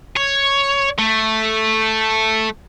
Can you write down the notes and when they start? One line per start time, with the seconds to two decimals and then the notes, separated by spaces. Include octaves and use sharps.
0.17 C#5
0.99 A3